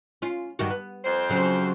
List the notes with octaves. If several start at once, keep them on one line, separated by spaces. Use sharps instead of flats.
C#4 F4
G2 D#3 F#4
B3
F2 C5
C#3 F#3 C#4